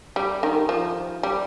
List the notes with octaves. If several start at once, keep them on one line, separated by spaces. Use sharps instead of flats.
G3
D#3
F3
G3